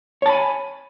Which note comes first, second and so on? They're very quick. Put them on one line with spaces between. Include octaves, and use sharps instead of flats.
C#5 A5 B5 G#5